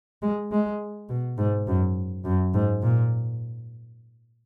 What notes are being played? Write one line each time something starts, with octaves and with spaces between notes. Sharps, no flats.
G#3
G#3
B2
G#2
F#2
F#2
G#2
A#2